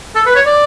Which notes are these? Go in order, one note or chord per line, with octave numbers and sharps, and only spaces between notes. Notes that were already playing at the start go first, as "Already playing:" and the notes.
A4
B4
C#5
D5